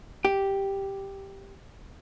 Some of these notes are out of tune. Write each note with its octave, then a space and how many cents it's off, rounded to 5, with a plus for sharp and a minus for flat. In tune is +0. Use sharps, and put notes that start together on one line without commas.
G4 +0